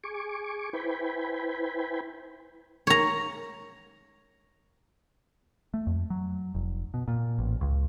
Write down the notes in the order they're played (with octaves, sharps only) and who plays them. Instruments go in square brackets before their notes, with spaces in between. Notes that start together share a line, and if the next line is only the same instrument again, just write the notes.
[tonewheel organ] G#4 G#5 C#6 D6
E4 B4 C5 G5 G#5 B5
[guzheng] C#5 A#5
[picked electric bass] A3
F2
F#3
F1
B2
A#2
A1
C#2